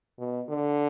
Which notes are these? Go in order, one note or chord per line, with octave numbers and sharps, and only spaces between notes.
B2
D3